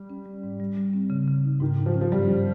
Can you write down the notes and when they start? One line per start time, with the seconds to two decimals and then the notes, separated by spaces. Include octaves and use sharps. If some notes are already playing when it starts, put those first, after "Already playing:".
Already playing: G3
0.10 C#4
0.26 G3
0.43 G#2
0.60 G3
0.77 G3
0.94 C4
1.10 C#3
1.28 C#3
1.45 D#4
1.60 G#2 D#3
1.78 G#2
1.86 F3
1.94 C#4
2.01 F3
2.12 G2 G3
2.28 F3